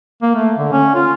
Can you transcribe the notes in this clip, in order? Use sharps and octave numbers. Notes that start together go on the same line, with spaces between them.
A#3
A3
D3
C#4
F4